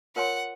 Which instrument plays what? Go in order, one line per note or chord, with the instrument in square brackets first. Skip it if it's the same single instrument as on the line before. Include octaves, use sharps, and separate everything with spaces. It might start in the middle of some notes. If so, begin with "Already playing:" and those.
[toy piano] F4 A#4 C#5 G#5 C6 [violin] F#5